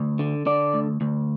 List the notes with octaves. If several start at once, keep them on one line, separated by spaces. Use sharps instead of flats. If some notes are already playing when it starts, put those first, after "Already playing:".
Already playing: D2
D3
D3 D5
D2
D2